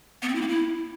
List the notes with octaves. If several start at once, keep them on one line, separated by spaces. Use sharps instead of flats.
B3
C4
E4
A#3
E4